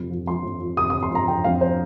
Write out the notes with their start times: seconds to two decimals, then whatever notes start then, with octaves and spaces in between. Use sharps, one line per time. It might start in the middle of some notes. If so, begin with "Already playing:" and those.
Already playing: F2 C3
0.10 F3
0.27 F3 C6
0.44 F2
0.61 F3
0.77 C3 D#6
0.90 D#6
0.94 C3
1.03 C6
1.11 F2 A#5
1.28 C3 G5
1.44 F2 F5
1.61 C5